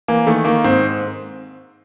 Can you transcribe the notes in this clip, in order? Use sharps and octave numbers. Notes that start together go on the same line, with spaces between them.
E3 A#3
D#3 A3
D#3 A#3
G#2 C4